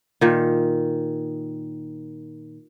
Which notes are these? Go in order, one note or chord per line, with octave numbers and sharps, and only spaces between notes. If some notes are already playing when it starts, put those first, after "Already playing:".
A#2 D#3